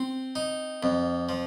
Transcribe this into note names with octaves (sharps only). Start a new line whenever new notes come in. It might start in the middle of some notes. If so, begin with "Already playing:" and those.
Already playing: C4
D#4
F2
F3